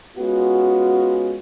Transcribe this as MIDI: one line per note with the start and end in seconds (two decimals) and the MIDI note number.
0.17 1.38 56
0.17 1.38 59
0.17 1.38 61
0.17 1.38 65
0.17 1.38 66